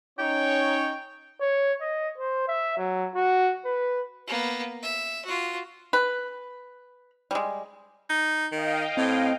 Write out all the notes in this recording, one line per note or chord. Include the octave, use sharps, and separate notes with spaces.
C#4 D#4 C#5 G5
C#5
D#5
C5
E5
F#3
F#4
B4
A#3 B3
E5
F4 F#4
B4
G3 G#3
D#4
D#3 D#5 F5 G5
A2 C4